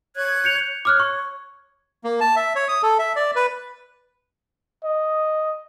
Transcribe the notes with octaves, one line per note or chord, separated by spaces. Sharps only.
C#5 F#6 G#6
G6 C#7 F7
C#5 D6 F6 F#6
C#6
A#3
A5
E5
C#5
D#6
A4
E5
D5
B4
D#5